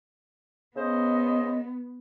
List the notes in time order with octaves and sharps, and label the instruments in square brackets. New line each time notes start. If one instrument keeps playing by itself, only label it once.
[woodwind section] C#3 C5 D#5 [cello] B3